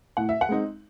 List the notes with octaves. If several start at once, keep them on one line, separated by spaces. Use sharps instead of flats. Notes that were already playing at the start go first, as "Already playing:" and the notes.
A2 F#5
E5
F#5
G#3 C4 D#4